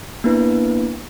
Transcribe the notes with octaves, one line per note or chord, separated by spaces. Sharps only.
A#3 B3 D4 E4 B4